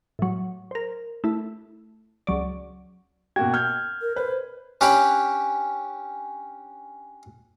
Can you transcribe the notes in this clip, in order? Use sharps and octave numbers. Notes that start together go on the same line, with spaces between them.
A2 F#3
A#4 C5
A3 E4
C#2 F#3 D5
B2 A#3 F#4 G5 G#6
F6 G6 G#6
A#4
B4 C5
C#4 D4 G4 C#5 G5 B5